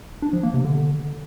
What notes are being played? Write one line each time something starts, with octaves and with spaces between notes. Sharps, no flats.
D4
F3
A#3
C3
D3